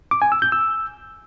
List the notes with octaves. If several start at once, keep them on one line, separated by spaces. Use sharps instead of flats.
D6
G#5
E6
G6
E6